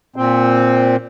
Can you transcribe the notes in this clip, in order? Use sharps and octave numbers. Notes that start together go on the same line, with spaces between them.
A#2 C4